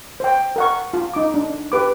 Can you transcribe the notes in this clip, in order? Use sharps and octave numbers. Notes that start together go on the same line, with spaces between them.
C5 G5
A#4 F#5 C#6
F4
D#4 D6
D4
G4 B4 D6